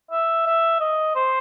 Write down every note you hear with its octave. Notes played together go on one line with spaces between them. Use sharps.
E5
E5
D#5
C5